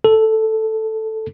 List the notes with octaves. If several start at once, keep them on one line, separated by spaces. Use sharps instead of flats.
A4